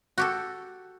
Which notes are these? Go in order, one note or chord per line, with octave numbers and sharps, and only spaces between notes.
F#4 G4 A4